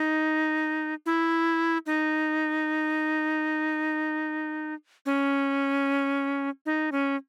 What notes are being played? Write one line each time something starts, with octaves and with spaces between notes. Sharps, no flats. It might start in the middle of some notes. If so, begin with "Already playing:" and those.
Already playing: D#4
E4
D#4
C#4
D#4
C#4